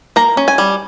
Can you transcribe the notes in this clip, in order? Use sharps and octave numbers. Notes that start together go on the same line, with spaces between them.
A#3 A#5
C#4
G#5
G3